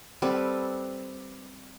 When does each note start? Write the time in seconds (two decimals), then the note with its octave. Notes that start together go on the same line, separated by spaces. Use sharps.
0.22 G3 C4 A4 B4